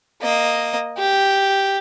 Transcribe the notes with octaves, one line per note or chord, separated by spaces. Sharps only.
A#3 D#5
G4